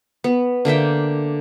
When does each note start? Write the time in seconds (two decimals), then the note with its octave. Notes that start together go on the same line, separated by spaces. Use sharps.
0.24 B3
0.65 D3 A#3 E5 G5